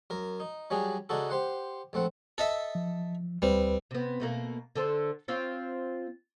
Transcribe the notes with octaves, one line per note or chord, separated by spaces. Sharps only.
F#2 A#4
D#4
F#3 G3 C#4 D4 G#4
C#3 D4 D#4 F#4 A4
G4 C5 F#5
A#1 A3 C4 F#5
A4 D#5 E5
F3
D2 G3 C4 B4
C3 B3
B2 A3 A#3
D3 A4 C5
C4 F4 C#5